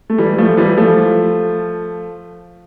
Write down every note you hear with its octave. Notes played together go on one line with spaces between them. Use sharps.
A3
E3 G3
F3 A3
E3 G3
F3 A3